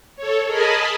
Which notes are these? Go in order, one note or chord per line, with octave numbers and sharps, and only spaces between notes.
A4 C#5
G#4 A#4 D#5 G#5 A5 B5